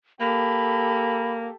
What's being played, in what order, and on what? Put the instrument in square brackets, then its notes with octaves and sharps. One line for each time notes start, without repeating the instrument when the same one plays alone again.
[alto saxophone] A#3 [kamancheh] G4 A4 [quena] B5